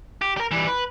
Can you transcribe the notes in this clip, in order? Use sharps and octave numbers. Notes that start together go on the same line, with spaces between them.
G4
G4 A#4
E3 G3
B4